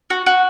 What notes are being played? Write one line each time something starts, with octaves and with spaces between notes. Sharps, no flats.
F#4
F#4